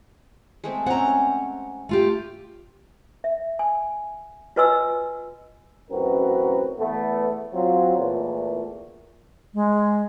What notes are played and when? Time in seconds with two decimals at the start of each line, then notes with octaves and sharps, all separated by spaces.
0.64 G#3 A3 C4
0.86 C4 C#4 F#5 A#5
1.89 A3 F4 G4
3.24 E5
3.59 G#5
4.56 F4 F#4 B4 D#5 G#5 E6
5.91 A1 F#2 C4 F#4 A#4 B4
6.79 E2 A3 B3
7.54 F#3 C4 F4
7.98 E2 A#2 A3
9.54 G#3